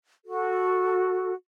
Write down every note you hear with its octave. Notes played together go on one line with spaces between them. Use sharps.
F#4 A4